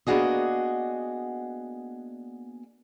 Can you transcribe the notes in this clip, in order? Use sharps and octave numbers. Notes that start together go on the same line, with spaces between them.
A#3 B3 D4 F#4 G#4 D#5